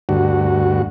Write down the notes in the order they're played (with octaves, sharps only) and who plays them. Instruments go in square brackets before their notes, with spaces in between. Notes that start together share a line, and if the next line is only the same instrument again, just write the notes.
[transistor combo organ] D2 G2 F#4